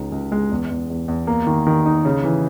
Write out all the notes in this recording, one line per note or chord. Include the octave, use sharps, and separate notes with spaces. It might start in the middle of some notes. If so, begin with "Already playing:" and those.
Already playing: C#2 D#4
C#2
G#3
E2
E2
E2
E2
A#3
D#3
D#3
D#4
C#3
E3